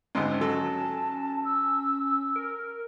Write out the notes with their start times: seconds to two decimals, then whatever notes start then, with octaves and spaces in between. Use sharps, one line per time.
0.15 G#1 D2 G#2 C#4
0.41 F#3 A4 A5
1.45 E6
2.36 A#4